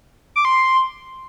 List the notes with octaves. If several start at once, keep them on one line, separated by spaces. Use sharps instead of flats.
D6
C6